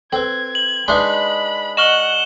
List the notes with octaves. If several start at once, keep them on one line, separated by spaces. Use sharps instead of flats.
C4 A4 B4 G#6
F#7
G#3 D4 D#4 B4 E5 B5 C6
D#5 F#5 C#6 F6 E7 F#7 G7